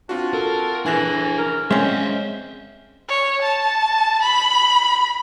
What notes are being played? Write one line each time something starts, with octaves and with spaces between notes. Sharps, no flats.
C4 D4 F4 F#4
A4 A#4
E3 D4 G#4 G#5 F#6 A#6
A#4
G#3 C4 C#4 D#5 E5
C#5
A5
B5